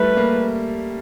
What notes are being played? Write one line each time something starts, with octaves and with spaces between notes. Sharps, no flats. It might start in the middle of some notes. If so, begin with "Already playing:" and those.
Already playing: G3 A3 B4
A#3